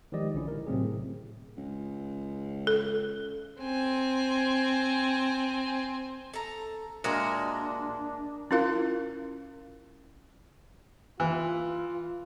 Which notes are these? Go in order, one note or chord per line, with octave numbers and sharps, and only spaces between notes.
D#3 F3 G#3 G4 D5 D#5
A#1 D3 C#4 E4
A#4
A2 C3 F#3 A3 C4 G#4
C#2
A4
C4 G#5
A4 A#5
A#2 G#3 D4 F#4 A#4 D#5 E5
C#4 E4 F4 A#4 F5
E3 F4